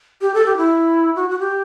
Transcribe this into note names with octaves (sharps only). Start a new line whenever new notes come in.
G4
A4
G4
E4
F#4
F#4
G4